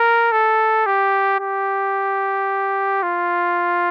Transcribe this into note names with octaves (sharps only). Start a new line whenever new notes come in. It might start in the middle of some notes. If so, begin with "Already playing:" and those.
Already playing: A#4
A4
G4
G4
F4